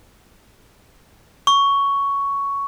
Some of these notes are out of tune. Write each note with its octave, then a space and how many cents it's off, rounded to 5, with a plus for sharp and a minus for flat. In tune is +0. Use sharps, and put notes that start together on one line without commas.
C#6 +10